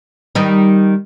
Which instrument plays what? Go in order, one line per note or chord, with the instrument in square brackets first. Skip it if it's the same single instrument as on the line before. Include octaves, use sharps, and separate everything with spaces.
[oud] D#3 G3 D#4